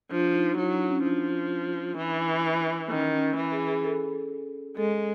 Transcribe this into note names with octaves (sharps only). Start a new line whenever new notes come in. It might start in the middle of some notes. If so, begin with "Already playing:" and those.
F3 D4
D#4
F#3 E4
D4
C#4
F3 D4
E3
D#3 C#4
C#4
E3
G#4
G#4
A4
G#3 A4